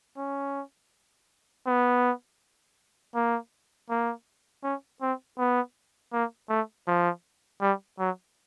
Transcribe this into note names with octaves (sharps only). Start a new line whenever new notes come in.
C#4
B3
A#3
A#3
C#4
C4
B3
A#3
A3
F3
G3
F#3